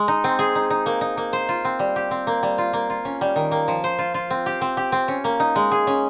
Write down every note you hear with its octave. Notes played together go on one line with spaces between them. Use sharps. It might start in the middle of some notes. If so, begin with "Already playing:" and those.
Already playing: G#3
D#4
C4
G#4
D#4
D#4
A#3
D#4
A#3
C5
F4
C4
G3
G4
C4
A#3
G3
F4
A#3
F4
C#4
G3
D#3
A#3
F3
C5
F4
F4
C4
G4
C4
G4
C4
C#4
A#3
D#4
G#3
G#4
C#4